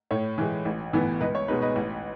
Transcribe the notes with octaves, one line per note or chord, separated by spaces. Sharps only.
A2 C#5
E3 G#3
A1
A2 E3 B3
C#2 B4 D#5
C#5
B2 G#3 D#4 B4
B4 D#5
A1